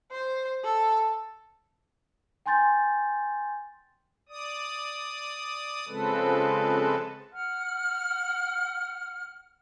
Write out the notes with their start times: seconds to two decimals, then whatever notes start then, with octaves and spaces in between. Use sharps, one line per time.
0.11 C5
0.64 A4
2.46 G5 G#5 C6 G6 A6
4.29 D5 D#6
5.88 C#3 F3 G#3 C4 A4 B4
7.32 F#5 F6